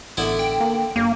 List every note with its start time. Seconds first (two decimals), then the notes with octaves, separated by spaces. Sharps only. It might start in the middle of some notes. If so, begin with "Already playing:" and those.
0.17 A1 D3 B3 E4
0.39 G5
0.61 A#3
0.96 G1 A#3